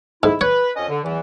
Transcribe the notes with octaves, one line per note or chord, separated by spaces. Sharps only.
G#2 E4
B4 C#5
F2 C#4 D#5
D3
E2 E3